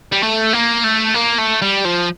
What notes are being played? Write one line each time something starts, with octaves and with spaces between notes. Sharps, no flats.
G3
A3
A#3
A3
A#3
A3
G3
F3